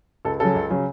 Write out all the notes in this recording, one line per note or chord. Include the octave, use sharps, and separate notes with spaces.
C#2 A4
C#3 F#3 A4
C#2
C#3 F#3